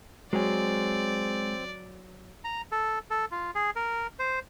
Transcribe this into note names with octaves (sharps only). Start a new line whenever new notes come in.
F#3 G#3 C4 G#4 D5
A#5
A4
A4
F4
G#4
A#4
C5